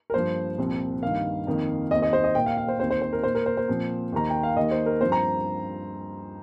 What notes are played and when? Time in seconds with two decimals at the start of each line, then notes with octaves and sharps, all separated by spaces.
0.10 A#4
0.14 G2 F3 A#3 C5
0.58 C2 A#2 F3 C4
1.02 G2 D#3 A#3 F5
1.47 F2 D#3 A#3
1.91 D#2 D#3 C4 D#5
2.02 D#5
2.13 C5
2.24 D#5
2.35 A#2 A#3 G5
2.46 F5
2.57 F5
2.68 C5
2.80 D#2 D#3 C4 C5
2.91 C5
3.02 C5
3.13 A#4
3.23 A#2 A#3 C5
3.35 A#4
3.46 C5
3.57 C5
3.68 A#2 F3 C4
4.12 D#2 D#3 A#3 A#5
4.30 G5
4.43 F5
4.56 D#2 D#3 A#3 D#5
4.71 C5
4.86 A#4
5.01 G2 F3 C4 C5
5.12 A#5